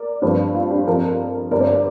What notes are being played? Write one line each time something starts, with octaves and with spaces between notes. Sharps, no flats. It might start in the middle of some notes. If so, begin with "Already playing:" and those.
Already playing: A#4 D5
G2 F3 C4 G4 C5
F4
D4 G4
F2 F3 D4 F4 A#4
G1 G2 G3 C4 A#4 D5
C5
A#4 D5